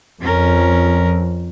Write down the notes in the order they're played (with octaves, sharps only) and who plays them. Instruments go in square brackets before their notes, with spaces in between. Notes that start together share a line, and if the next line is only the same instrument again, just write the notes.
[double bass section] F2 [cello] C#4 A#4